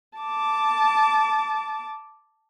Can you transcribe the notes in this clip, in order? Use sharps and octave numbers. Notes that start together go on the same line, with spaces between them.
A5 D6